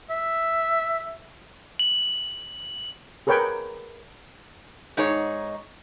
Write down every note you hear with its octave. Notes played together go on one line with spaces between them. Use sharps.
E5
F#7
G#4 A#4 B4 C#5 G5
G#2 D#4 G#4 C#5